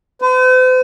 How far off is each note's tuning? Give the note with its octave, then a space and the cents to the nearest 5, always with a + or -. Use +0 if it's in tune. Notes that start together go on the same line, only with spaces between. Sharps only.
C5 -45